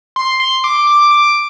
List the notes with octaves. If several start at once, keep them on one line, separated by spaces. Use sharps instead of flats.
C6
C6
D6
D6
D6